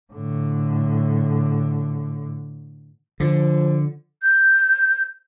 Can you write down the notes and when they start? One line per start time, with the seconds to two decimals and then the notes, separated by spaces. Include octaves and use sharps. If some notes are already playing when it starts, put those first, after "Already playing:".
0.12 A2 D3
3.20 D3 F3
4.22 G6